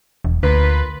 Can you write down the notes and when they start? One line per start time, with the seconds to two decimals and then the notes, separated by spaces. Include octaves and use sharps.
0.25 E1
0.43 D2 A#3 F4 B4